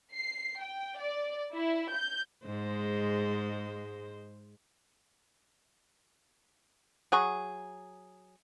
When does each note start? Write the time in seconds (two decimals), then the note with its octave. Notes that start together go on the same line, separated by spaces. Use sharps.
0.15 C7
0.63 G5
1.00 D5
1.53 E4
1.94 G6
2.46 G#2 G#3 C5
7.12 F#3 G#4 C#6